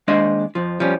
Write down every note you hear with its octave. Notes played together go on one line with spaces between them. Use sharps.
D#2 G#3 D4 C5 D#5 F5
F2 F3
F3 G3 C#4